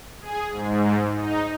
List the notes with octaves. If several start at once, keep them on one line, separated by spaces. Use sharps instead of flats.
G#4
G#2
D#4